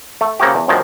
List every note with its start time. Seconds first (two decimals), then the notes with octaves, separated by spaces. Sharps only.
0.21 A3
0.40 C#3 A#3 C4 F#4 G4
0.55 E2
0.68 F#2 A#2 D3 D#3 F3 G#3